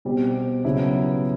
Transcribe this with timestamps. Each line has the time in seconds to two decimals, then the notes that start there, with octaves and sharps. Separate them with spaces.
0.05 B2 G3 C4
0.64 C#3 F#3 B3 E4